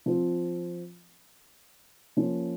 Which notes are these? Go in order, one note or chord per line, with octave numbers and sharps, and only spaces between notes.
F3 C4 F4
F3 A#3 C#4